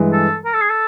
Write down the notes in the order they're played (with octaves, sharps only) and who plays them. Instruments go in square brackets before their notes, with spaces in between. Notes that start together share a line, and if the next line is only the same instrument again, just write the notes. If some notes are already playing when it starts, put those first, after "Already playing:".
Already playing: [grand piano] G2 E3 G#3
[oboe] A4
A#4
A4
G#4
A4